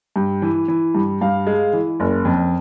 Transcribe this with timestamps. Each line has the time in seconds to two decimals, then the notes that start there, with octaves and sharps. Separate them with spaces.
0.16 G2
0.42 E3
0.68 E3
0.95 G2
1.21 G2 F5
1.47 G#3
1.73 E3
2.00 F#1
2.25 F2